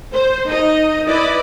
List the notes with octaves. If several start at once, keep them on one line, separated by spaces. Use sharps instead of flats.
C5
D#4 D#5
E4 B4 D5 D#5